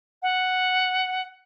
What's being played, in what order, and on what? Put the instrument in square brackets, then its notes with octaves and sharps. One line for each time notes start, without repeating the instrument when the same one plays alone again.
[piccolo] F#5